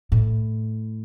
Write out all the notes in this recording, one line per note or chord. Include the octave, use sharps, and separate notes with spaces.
A2